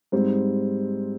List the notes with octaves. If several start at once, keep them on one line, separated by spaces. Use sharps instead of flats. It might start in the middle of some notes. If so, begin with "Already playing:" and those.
G#2 G3 C4